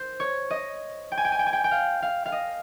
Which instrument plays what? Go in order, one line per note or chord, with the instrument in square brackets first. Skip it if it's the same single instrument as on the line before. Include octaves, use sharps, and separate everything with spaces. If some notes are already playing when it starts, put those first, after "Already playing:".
Already playing: [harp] C5
C#5
D#5
G5
G#5
G5
G#5
G5
G#5
G5
G5
F5
F5
F5
D#5